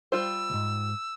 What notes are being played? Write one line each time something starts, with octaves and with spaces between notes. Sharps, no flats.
G3 F4 C5 E6
C#2 G#2